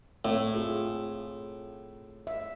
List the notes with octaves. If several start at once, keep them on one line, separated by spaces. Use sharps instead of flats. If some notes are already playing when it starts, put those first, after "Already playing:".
A2 C4
F4 G#4
E5